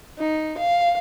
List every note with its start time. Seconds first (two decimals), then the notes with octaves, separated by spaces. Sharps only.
0.19 D#4
0.58 F5